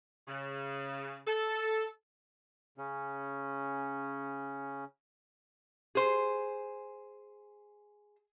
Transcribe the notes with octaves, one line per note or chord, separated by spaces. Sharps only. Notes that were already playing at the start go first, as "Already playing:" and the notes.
C#3
A4
C#3 C#4
G#4 C5